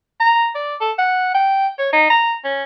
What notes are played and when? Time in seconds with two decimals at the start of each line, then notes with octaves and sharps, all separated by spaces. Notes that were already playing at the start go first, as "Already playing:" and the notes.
0.20 A#5
0.55 D5
0.81 A4
0.98 F#5
1.34 G5
1.79 C#5
1.93 D#4
2.10 A#5
2.44 C#4